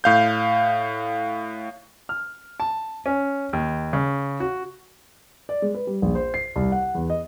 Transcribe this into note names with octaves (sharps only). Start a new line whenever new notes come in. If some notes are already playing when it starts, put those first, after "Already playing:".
A2 F5 G6
F6
A5
C#4
D#2
C#3
F#4
D5
G#3
B4
G3
A#1
C5
C7
C2
F#5
E2
D#5